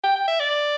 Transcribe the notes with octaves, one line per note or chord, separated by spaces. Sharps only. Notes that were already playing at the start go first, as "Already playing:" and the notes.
G5
G5
E5
D5